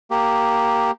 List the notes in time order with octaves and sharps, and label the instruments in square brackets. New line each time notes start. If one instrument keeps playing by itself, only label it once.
[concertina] A#3 G4